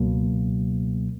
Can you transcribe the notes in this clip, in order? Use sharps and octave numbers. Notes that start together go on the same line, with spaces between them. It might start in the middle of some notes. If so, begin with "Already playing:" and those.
Already playing: C#2 B2 F#3 A#3